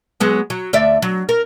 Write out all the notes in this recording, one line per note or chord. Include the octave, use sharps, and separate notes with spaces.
F#3 G#3 B3
F#3
D2 D5 E5
F#3
A#4